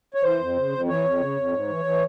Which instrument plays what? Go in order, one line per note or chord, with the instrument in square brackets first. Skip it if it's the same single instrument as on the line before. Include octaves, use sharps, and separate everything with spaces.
[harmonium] C#5
E3 C5
F2
C#3
F2
E3 C#5
F2
C#3
F2
G#2
E3
E3